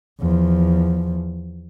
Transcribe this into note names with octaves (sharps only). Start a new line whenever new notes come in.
E2 F3